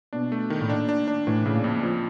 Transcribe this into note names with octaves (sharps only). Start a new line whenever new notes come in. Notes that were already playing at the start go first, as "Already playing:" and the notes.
B2 D4
A3
D#3
A2
A#2 D4
D4
D4
A2 E3
A2 C#3
A#2
F2
F3